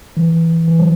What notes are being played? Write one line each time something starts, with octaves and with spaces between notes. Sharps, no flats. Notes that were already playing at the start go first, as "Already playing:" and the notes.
E3
E3
F#3